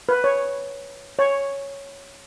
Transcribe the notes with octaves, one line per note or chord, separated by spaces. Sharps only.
B4
C#5
C#5